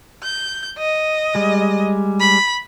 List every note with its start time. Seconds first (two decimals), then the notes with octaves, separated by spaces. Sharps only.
0.23 G6
0.78 D#5
1.35 G3 G#3
2.20 B5